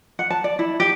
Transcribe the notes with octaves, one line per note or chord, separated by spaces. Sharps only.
F#5
A5
D5
E4
G4